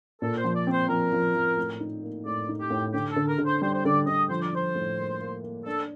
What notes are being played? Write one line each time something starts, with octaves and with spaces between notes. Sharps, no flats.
A#2 A4
C5
F3
D5
C4
C5
F3 A#4
F3
F3
A2
D#4
A#3
A2 D5
D#4
G4
A2
D3 G4
A4
D3
A#4
D3
C5
G3 C5
C5
D3 D5
D3 D#5
F3 C5
D5
F3 C5
A2
A#3
A#3
A#3
D4 A4